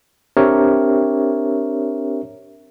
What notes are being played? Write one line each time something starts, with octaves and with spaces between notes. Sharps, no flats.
C4 D4 G4 A#4 C#5 E5